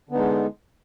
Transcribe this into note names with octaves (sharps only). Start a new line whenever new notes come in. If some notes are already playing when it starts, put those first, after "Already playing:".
D3 G#3 B3 D#4